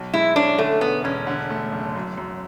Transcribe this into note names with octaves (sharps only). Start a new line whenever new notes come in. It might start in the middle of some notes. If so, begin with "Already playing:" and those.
Already playing: B1
G#3 E4
C#4 D4
D3 A3
E1 B3
E1 C#4
D3
A3
F#1
F#2
F#2